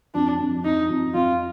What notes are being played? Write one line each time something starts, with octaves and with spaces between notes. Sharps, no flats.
F2 D4
F2
F2 D#4
F2
F2 F4